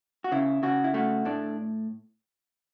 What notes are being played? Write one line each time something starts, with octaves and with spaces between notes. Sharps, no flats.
F#4
C#3 E4
C#3 F#4
E4
A3 F#4
A2 D4